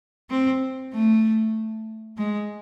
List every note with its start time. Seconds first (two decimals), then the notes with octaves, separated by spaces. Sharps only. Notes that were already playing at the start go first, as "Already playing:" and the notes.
0.30 C4
0.93 A3
2.18 G#3